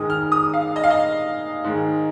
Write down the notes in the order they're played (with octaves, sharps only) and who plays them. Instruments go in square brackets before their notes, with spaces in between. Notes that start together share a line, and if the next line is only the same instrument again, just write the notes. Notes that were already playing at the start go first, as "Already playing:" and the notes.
Already playing: [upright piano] G#2 D#3 G#3 D#6
F6
D#6
F5
D#5
F5
D#5
G#2 D#3 G#3